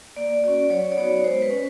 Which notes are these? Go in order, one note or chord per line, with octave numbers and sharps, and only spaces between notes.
A#3 D5
C#4 F#4 D5
F#3 C#5
D5
B3 D#4 F#4 C#5
G#3 C5
B4
C#4